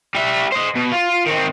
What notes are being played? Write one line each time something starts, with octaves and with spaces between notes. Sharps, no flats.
G3 E5
C5 D#5
B2
F4
D#3 C4